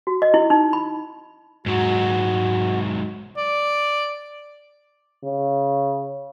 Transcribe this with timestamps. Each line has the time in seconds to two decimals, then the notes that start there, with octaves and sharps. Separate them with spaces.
0.07 F#4
0.22 D#5
0.34 E4
0.50 D#4
0.73 B5
1.66 G#2 F#3 F#4
3.37 D5
5.25 C#3